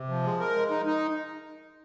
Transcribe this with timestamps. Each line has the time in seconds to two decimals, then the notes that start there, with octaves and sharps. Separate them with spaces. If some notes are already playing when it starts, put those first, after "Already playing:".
Already playing: C3
0.09 F3
0.24 G#3
0.40 A#4
0.55 G#3
0.70 D#4
0.86 D#4